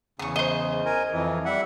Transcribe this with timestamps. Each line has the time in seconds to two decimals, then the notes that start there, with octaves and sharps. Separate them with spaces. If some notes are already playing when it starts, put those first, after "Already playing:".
0.19 E2 C#3 C#6 D#6
0.36 C5 D#5
0.86 A#4 G#5
1.12 F2 E3
1.46 G3 E5 F#5